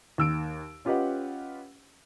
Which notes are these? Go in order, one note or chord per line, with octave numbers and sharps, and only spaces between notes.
D#2 E6 D7
C#4 F4 G4 B4 D#5 F#5